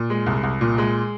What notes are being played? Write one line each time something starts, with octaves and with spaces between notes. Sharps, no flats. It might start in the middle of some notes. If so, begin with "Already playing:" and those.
Already playing: A#2
G#3
C2
C2
A#2
G#3